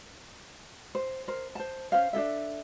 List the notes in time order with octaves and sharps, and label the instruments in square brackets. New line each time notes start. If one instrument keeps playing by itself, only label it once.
[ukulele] C5
A#4 C5
C5 A5
C#4 D#4 C5 F5
D4 D#4 A4 E5